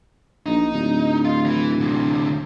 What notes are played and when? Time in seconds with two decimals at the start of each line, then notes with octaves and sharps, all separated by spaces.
0.46 A#1 D#4
0.73 D1
1.25 F4
1.45 E3
1.81 D2 C3